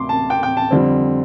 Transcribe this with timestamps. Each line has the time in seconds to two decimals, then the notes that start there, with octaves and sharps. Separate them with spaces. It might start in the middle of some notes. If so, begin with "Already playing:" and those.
Already playing: D2 C3 C6 D6
0.09 A5
0.30 G5
0.43 G5
0.57 A5
0.71 F2 D3 G3 C4